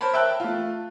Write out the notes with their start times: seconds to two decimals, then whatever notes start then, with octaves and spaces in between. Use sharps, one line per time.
0.01 A#4 C5 C#5 A5 B5
0.14 E5 G5 A5 F#6
0.40 A3 F4